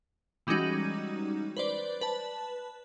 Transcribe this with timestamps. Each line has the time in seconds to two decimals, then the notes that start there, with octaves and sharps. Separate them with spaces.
0.47 E3 G3 G#3 C#4 D#4 F#4
1.57 B4 C5 D5
2.01 B4 A5